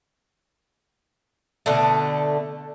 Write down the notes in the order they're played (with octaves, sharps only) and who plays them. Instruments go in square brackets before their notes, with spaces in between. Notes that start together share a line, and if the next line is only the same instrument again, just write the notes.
[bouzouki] B2 D3 A3